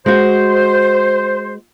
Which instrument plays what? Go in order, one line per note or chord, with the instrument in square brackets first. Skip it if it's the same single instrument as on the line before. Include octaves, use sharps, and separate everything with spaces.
[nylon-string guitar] G#3 F#4 [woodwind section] C5